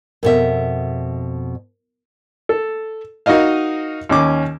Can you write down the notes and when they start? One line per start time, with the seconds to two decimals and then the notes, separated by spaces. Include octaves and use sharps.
0.23 F2 B2 A#4 E5
2.49 A4
3.26 D#4 F#4 A#4 D#5 F5
4.09 D#2 C#4 D6